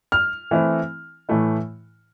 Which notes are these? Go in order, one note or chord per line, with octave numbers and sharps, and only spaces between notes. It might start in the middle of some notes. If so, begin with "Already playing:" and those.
F6
E3 A3 C4 E4
A2 E3 A3 E4